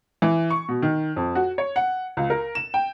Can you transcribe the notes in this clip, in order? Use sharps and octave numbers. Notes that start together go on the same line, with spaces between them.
E3
C#6
B2
D#3
F2
F#4
C#5
F#5
C#2
A#4
E7
G5